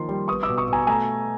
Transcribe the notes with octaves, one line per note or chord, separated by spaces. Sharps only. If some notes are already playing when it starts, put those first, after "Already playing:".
Already playing: D#3 F3 A#3 C6
G3
B3 C#6 D#6
D6 E6
B2
C#6 D#6
B2 G#5 A#5
A3 G#5 A#5